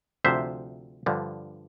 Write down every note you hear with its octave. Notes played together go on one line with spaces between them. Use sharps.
D2 C3 F3 C5 E5
G2 D3 F3